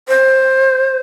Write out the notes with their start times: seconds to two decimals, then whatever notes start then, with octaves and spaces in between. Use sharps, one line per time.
0.08 C5